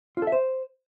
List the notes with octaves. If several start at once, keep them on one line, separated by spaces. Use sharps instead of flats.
F4
A4
E5
C5